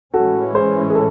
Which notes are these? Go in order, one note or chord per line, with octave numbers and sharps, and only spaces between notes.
A2 E3 G#3 C#4 F#4 A4
G#4 C5
G#4
A4